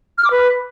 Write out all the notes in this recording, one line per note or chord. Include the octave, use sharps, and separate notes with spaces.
F6
D6
B4